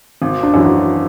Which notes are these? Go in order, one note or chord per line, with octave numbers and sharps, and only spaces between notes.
G#1
D4
F#2 E3
F#4